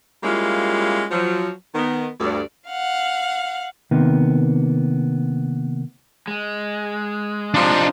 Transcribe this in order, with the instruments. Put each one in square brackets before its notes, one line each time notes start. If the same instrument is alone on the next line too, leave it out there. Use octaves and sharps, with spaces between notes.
[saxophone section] G3 G#3 A#3 C#4 E4 F4
F3 F#3
D#3 B3
D2 G2 D5
[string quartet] F5 F#5
[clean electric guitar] C3 D#3 A#3 B3
[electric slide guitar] G#3
[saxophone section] C3 F3 [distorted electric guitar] D4 D#4